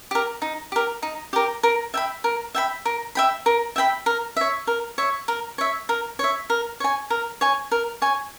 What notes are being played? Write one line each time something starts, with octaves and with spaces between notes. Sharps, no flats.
G4 A#4
D#4
G4 A#4
D#4
G4 A#4
A#4
E5 G5 B5
A#4
E5 G5 B5
A#4
E5 G5 B5
A#4
E5 G5 B5
A#4
C#5 E5
A#4
C#5 E5
A#4
C#5 E5
A#4
C#5 E5
A#4
C#5 G#5
A#4
C#5 G#5
A#4
C#5 G#5